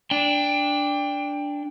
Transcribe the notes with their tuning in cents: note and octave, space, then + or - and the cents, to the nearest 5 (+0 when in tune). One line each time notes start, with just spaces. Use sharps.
D4 -10 G5 +20